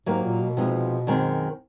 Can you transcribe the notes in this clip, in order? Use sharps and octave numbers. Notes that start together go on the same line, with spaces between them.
G#2 F#3 A#3 D#4 G4 A#4
A#2
B2
C3 F3 G#3 B3 D#4
F#2 D#3 G#3 C4